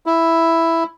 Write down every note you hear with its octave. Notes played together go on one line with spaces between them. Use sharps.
E4